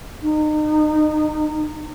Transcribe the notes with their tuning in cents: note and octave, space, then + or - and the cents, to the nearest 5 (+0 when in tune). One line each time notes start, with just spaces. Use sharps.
D#4 -30